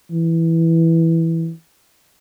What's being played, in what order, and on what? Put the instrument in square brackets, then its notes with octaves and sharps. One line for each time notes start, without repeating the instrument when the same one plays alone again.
[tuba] E3